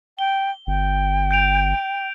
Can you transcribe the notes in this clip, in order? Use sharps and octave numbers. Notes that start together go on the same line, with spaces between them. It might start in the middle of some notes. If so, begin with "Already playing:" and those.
G5 G7
G1 G5
G6 D7 F7